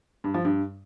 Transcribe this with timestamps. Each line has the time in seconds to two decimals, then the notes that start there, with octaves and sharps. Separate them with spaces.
0.24 G2
0.34 F3
0.45 G2